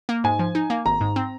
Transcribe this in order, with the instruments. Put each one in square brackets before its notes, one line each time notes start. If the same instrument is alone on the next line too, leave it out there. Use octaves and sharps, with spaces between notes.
[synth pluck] A#3
[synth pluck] G#2 [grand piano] G#5
[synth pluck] F3
D#4
A#3
[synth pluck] G#1 [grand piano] A#5
[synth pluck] G#2
C4